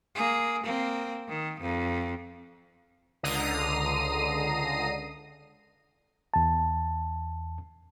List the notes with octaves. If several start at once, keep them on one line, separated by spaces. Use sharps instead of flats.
A#3 G#4
A#3 C4
D#3
F2
C#2 D3 A#5 D#6 C7 D#7
E2 A5